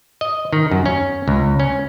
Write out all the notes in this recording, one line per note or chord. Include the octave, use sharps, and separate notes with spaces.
D#5
D#3
F#2
C#4
C#2
C#4